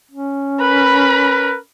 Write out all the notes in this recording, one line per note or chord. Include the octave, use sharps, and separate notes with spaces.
C#4
A#4 B4 B5